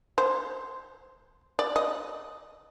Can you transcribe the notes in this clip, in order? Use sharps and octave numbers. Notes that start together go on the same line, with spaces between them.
C5
D5
D#5